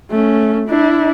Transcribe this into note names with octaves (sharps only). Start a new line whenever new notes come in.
A3 C#4
D4 E4